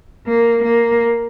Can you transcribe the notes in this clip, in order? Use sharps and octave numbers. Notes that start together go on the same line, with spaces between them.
A#3
A#3